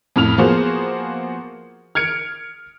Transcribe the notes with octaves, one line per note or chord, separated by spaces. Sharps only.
F2 A2 F6 F7
F3 A#3 B3 F#4 G#4 C5
F6 G#6 C#7 D7